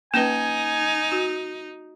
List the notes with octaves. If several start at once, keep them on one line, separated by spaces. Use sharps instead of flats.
A#3 C#4 D#4 B4 G#5
F#4